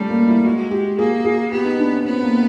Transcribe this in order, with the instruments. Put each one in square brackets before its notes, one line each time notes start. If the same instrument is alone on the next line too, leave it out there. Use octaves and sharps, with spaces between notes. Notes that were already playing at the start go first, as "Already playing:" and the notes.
Already playing: [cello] G3 [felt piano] A3 C#4
[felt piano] A#3
E4
[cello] G#3 [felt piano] F#4
[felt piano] G4
[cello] A#3 [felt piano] G#4
[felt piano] G#4
[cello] B3 [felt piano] G4
[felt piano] D#4
D4
C#4
[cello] B3 [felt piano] C4
[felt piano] A#3